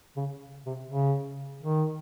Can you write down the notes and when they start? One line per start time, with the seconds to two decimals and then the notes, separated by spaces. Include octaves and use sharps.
0.17 C#3
0.66 C3
0.90 C#3
1.63 D#3